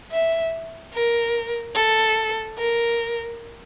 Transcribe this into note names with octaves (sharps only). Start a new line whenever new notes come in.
E5
A#4
A4
A#4